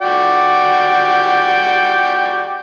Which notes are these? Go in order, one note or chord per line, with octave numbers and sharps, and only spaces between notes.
F#4 D5 G5